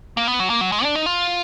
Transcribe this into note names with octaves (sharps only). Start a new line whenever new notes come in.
A#3
B3
F#3
A#3
F#3
G#3
D4
D#4
F4